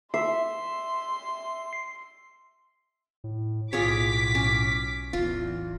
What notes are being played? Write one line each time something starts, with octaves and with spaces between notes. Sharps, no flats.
E5 C6 C7
A2
B1 A2 F4 G#4 C#5 D6 B6
C#4
D1 E2 F4